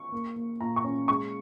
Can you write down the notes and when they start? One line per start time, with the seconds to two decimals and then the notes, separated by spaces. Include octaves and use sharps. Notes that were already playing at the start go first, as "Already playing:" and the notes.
Already playing: C#6
0.12 A#3
0.36 A#3
0.61 A#2 A#5
0.76 C#6
0.84 C#4
1.08 G#3 C#6